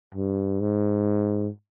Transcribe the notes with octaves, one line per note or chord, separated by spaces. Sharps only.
G2
G#2